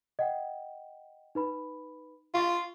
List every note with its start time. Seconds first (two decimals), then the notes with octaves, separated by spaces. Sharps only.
0.19 D#5 F#5 G5
1.35 D#4 B4 B5
2.34 F4 F5 C#6 A6